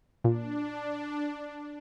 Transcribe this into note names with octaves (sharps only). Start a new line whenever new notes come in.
A#2 D4